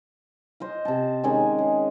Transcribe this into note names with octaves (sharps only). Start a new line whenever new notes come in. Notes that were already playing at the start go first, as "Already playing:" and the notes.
C5 D#5 F5
C3 A5
D#3 G#3 C#4 G#5
G#4